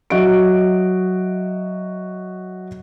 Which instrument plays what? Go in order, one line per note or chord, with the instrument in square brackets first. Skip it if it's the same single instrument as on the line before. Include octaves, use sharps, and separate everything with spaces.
[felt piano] F#3 F#4 D#5 E5 D7